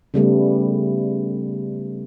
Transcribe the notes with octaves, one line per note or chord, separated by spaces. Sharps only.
C#3 G3 A3 B3